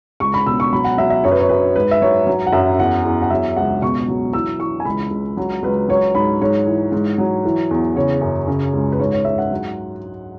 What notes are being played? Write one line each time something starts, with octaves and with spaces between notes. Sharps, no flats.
C#2 C#6
B5
B2 E6
C#6
F#3 B5
F#5
F#3 E5
E5
F#2 C#5
B4
C#5
F#2 B4
G#2 B4
E5
F#3 C#5
F#3
F#5
F#2 E5
E2 F#5
E2
F#5
F#3 E5
C#2 F#5
B2 C#6
F#3
E3 E6
E3 C#6
G#5
C#2 B5
C#2
F#3
C#2 B4
F#3 C#5
G#2 B5
G#2 C#5
E3
G#2
F#3
E3
E2
C#3 C#5
F#2
C#3
C#2
B4
G#2 C#5
C#5
G#2 E5
F#5
F#3